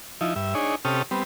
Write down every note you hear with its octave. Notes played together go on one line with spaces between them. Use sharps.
F3 D#4 E4
G2 E5
D4 D#4 G#4 C#5
C3 C#4 G4 A4 D#6 F6
G3 B3 C4